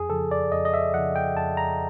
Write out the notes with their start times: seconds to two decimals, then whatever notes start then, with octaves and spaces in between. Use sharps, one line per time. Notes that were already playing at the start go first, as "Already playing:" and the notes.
Already playing: F2 G#4
0.10 C#3 F3 A4
0.31 D5
0.52 F2 D#5
0.65 D#5
0.74 E5
0.94 C#3 F3 F#5
1.16 G5
1.36 F2 A5
1.57 A#5